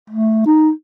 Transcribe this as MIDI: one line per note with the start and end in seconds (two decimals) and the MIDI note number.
0.10 0.46 57
0.46 0.70 63